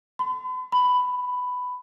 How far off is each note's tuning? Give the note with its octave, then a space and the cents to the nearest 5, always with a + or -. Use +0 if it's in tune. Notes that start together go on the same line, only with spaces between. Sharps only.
B5 +45
B5 +10